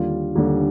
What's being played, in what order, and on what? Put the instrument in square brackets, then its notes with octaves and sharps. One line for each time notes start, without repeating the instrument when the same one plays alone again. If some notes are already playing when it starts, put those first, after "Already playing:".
Already playing: [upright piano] D#2 D3 G3 F4
D#2 D3 G3